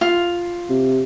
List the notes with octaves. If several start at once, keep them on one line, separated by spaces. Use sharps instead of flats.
F4
C3